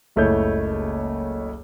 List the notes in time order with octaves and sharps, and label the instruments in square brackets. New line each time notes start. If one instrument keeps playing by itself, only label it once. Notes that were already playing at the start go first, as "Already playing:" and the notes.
[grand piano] F#1 C#2 A3 E4 C#5 G6